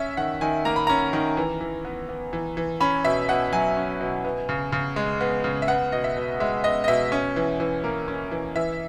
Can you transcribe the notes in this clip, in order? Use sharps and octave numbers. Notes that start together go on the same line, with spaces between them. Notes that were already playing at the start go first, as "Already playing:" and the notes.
Already playing: C#4 E5
D#3 F#5
D#3 G#5
A#3 A#5
B5
C#4 A#5
D#3
E3
E3
B3
B3
E3
E3
C#4 B5
B2 E5
B2 F#5
F#3 G#5
C#4
B2
B3
C#3
C#3
G#3
B3
C#3
E5
B3 F#5
B2 D#5
E5
B2
G#3 E5
B3 D#5
D#5
B2 E5
C#4
E3
E3
A#3
C#4
E3
E3 E5